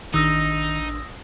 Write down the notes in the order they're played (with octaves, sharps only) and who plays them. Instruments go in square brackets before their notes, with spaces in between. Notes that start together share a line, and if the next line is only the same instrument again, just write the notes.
[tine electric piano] A1 D4 [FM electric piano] D#3 [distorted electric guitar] D#4 [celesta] D#6 E6 A#6